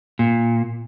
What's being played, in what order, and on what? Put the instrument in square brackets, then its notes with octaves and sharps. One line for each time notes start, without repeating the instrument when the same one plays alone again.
[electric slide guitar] A#2